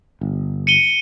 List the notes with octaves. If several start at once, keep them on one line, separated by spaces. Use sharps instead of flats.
G1
C#7 D#7 G7